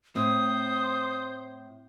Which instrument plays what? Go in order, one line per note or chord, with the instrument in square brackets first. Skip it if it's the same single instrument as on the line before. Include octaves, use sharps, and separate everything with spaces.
[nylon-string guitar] A2 [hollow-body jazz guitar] C4 [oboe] C5 [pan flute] D#6